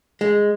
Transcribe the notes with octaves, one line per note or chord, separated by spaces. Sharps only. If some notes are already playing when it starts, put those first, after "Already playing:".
G#3